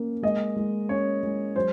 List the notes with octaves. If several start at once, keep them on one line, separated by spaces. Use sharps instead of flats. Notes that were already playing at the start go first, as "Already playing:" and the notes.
Already playing: A#3 C#4
G#3 D#5
G#3
C#4 C#5
G#3
F#3 C5